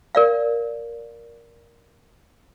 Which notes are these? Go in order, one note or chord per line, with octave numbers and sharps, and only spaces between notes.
A#4 D5 F5